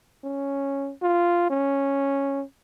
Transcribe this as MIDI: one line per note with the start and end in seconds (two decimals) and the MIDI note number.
0.24 0.92 61
1.02 1.48 65
1.50 2.43 61